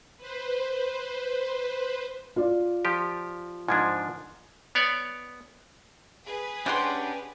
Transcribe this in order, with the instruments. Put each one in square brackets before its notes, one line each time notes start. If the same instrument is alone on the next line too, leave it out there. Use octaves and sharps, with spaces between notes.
[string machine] B4 C5
[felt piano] F4 D5
[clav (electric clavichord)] F3 G4
[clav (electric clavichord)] G#2 F3 D4 [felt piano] G#6
[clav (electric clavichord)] B3 C#5 D5
[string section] G#4 B4
[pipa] G3 F#5 C6 [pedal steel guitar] C#4 D4 G4